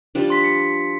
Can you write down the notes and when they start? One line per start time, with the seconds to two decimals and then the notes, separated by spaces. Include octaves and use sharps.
0.15 F3 G3 D4
0.30 C6 B6
0.44 C#7